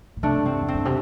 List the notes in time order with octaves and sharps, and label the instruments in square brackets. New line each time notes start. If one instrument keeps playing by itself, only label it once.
[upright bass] A2
[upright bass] C3 [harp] A3 D4
[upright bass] G2
[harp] C4
[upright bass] E2
[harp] C4
[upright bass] G2
C3